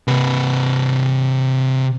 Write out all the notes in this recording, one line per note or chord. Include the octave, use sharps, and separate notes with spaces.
C3 B4